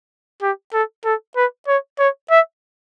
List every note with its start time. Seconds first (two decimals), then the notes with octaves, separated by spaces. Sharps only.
0.42 G4
0.73 A4
1.05 A4
1.36 B4
1.68 C#5
1.99 C#5
2.31 E5